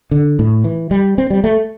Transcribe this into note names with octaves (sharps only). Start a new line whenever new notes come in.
D3
A2
E3
G3
C4
G3
A3